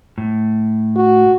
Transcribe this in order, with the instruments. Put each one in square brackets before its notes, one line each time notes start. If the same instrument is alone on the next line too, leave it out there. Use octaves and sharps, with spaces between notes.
[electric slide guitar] A2
[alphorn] F#4